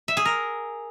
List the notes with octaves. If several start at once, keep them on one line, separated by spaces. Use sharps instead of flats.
E5
G#4
A#4